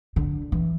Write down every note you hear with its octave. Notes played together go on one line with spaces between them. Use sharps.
D3
E3